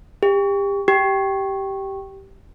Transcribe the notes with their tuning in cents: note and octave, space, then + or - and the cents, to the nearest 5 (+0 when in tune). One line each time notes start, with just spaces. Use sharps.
G4 +30
G4 -10